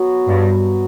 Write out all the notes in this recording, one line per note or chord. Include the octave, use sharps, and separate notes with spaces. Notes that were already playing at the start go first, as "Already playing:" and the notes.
Already playing: F#3 B3 F#4
G2